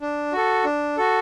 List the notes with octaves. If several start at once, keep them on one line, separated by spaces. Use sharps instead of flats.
D4
F#4 A4
D4
F#4 A4